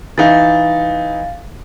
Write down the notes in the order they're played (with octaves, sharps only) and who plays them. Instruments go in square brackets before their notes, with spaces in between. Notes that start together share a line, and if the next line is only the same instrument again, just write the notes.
[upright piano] E3 D#4 [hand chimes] F5 A6